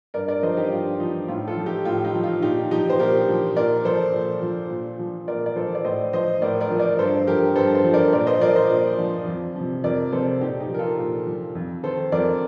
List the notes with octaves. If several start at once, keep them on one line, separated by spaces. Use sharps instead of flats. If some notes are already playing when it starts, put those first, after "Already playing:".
G2 A#4 D5
A#4 D5
F3 C5 D#5
D#4 G4
G2 F4
F3 D#4
A2 F4
F4 A4
F3
D#4 G4
A2 F4
D#4
F3
F4
A#2 D#4 G4
F3 D#4 G4
C5
A#2 G4 A#4
F3
A#2 A#4 D5
F3 A4 C5
A#2
F3
A#2
F3
A#2 A#4 D5
D5
F3 A4 C5
D5
A2 C5 D#5
F3 C5 D#5
A2 A#4 D5
A#4 D5
F3
A#4 D5
G2 A4 C5
F3 G4 A#4
G2 A4 C5
A4 C5
F3
A#4 D5
A#2 A#4 D5
C5 D#5
F3 A#4 D5
C5 D#5
A#2
F3
F2
C3 F3
F2 A#4 D5
C3 F3 A4 C5
A#2 D#4 G4
D#4 G4
F3
A#4
F4 A4
A#2
F3
F2
D#3 A4 C5
F2 A#4 D5